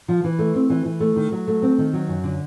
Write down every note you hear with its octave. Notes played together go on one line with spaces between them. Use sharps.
F3
E3
A3
C4
E3
E3
A3
D#3
F#3
A3
C4
D#3
F#3
F#2
D3